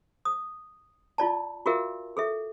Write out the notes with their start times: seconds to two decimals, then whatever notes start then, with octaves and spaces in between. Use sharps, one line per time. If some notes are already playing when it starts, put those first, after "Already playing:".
0.25 D#6
1.18 E4 F4 D5 A5
1.66 F4 F#4 G#4 A#4 E5 F5
2.17 G#4 A4 E5